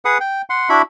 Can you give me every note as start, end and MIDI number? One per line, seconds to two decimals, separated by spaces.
0.05 0.18 68
0.05 0.18 71
0.05 0.18 78
0.05 0.18 87
0.20 0.42 79
0.50 0.69 78
0.50 0.69 84
0.69 0.82 62
0.69 0.82 64
0.69 0.82 66
0.69 0.82 76
0.69 0.82 83